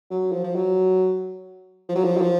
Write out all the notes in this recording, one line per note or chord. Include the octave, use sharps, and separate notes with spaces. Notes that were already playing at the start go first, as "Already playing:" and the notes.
F#3
F3
F3
F#3
F3
F#3
F3
F#3
F3